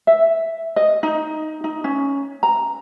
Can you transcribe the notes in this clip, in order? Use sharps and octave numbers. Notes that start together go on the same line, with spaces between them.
E5
D#5
D#4
D#4
C#4
A#5